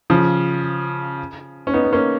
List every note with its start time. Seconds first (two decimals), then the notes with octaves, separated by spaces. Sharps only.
0.10 C#3 F3
1.67 C#4
1.73 B3 D#4
1.84 B3
1.93 A#3 C#4